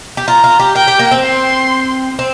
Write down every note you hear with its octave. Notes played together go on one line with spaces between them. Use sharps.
G4
F4 A#5
F4
G4
A#4 G5
G4
A#3
C4
C6
C4